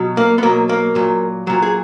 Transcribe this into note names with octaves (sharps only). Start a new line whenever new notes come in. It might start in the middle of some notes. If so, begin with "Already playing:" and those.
Already playing: B2 F#3
A#3
B3
B2 F#3 A#3
A#3
A#2 F#3
A#2 F#3
G#4